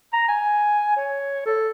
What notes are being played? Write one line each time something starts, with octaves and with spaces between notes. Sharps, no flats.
A#5
G#5
C#5
A4